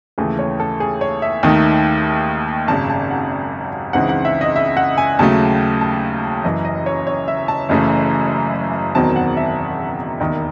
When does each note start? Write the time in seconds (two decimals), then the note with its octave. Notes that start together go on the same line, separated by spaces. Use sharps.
0.18 D#2 C#3 E3 A3 G#4
0.39 C#5
0.60 A4
0.80 G#4
1.01 C#5
1.22 E5
1.43 D#2 D#3 A3 D#4
2.68 G#1 F#2 C#3 A5
2.90 A5
3.10 F#5
3.93 C#2 C#3 E3 C4 D#4 F#5
4.09 F#5
4.25 E5
4.41 D#5
4.56 E5
4.77 F#5
4.98 G#5
5.19 D#2 C#3 F#3 A3 A5
5.81 A5
6.44 F#1 F#2 E3 D#5
6.65 D#5
6.86 C#5
7.07 C#5
7.28 E5
7.48 A5
7.69 F#1 F#2 C#3 E3 A3
8.95 E1 E2 D#3 F#3 C4 A5
9.16 F#5
9.37 E5
10.20 E1 D#2 D#3